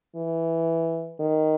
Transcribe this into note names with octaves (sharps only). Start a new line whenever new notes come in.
E3
D#3